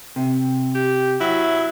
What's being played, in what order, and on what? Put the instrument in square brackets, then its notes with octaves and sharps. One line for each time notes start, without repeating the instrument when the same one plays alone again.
[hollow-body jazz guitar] C3
[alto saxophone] G4
[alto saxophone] F#3 [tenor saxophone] E4